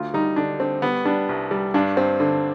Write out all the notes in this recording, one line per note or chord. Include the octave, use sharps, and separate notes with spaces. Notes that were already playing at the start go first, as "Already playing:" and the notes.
Already playing: D2 F4
G3 D#4
D3 D4
D3 C4
G3 B3
G3 D4
C2
G3
G2 D4
G2 C4
D3